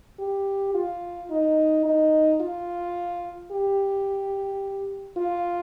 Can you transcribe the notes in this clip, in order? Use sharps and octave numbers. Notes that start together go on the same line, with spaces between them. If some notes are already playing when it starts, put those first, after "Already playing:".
G4
F4
D#4
D#4
F4
G4
F4